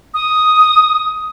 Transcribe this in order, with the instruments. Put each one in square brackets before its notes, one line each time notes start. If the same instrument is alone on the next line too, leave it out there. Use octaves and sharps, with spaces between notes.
[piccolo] D#6